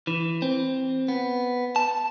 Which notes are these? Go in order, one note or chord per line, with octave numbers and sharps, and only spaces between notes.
E3
C4
B3
A5